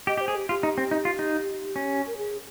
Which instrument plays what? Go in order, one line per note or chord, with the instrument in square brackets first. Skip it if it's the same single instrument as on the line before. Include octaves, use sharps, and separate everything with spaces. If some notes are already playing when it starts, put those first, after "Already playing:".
[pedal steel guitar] G4 [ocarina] D#5
[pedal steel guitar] G4 [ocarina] C5
[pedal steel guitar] G#4
[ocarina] G4
[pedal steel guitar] F4 [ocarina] G4
[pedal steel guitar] D#4
C4
D#4
F4
D#4
C#4
[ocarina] A#4
G#4